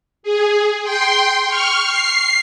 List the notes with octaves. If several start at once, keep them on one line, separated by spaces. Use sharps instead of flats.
G#4
G5 C6
C#6 F6
C7